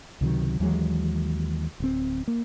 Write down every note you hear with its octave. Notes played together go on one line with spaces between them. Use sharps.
C#2 C3 D#3 F#3
D#2 E3 F#3 G#3
D1 C4
A#3